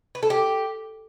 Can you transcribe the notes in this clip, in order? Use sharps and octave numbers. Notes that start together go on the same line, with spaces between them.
B4
A4
G4